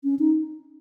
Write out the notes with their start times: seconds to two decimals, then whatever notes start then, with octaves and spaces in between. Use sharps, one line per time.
0.04 C#4
0.19 D#4